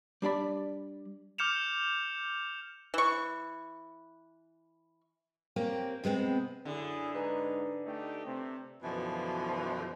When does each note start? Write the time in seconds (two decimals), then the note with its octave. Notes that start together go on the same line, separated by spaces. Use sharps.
0.22 G3 D4 D5 B5
1.38 D6 F6 G6 C#7 E7 F7
2.94 E3 C#6
5.56 A#3 C4 C#4 G4
6.04 C3 G#3 B3 C4
6.65 F#2 D3 E4 G#4
7.14 G#2 D#4 B4 G#5 A#5
7.85 A3 D#4 G4
8.25 C3 A3 C4
8.83 F#2 B2 D3 E3 F3